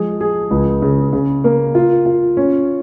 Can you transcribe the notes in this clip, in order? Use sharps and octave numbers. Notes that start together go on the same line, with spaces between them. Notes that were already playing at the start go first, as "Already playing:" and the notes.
Already playing: F3 G#3 G#4
G#4
C#2
C#3
C#3
A#3
F4
F4
C#4